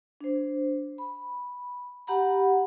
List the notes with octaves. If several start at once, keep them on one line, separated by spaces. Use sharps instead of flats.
D4 C5
B5
G4 F#5 A#5 B5